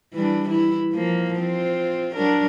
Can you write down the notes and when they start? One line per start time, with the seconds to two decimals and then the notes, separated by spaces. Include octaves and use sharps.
0.13 E3 G3 D4
0.49 E3 E4
0.93 F3 A#3
1.40 C4 F4
2.15 F#3 D4 A#4